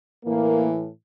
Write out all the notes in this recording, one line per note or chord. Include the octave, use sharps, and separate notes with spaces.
A2 E3 A#3